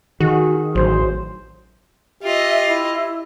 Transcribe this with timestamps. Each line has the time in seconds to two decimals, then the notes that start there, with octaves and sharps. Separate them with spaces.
0.20 D#3 F#4 G#4
0.75 A1 F#3 C5
2.23 F4 G4 D#5 E5
2.67 E4